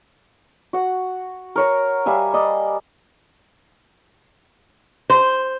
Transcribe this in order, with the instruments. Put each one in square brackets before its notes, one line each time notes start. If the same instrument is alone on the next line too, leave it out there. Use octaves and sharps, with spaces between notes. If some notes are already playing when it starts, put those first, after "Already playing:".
[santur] F#4 F#5
A#4 C#5 A#5
G3 E5 F5 G#5
D5 D#5
[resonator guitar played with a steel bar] C5